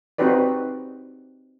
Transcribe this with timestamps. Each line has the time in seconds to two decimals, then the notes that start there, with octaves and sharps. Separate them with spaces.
0.18 C4 D#4 F#4 G4 B4 D5